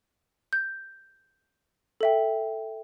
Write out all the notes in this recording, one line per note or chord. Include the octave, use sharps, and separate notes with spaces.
G6
A4 E5 G5